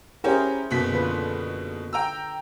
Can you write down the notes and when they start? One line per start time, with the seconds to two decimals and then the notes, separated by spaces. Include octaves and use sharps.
0.24 C#4 E4 G4 G#4 A#4 C5
0.70 F#1 B2 B6
0.92 D3 F4 B4
1.93 G5 A#5 E6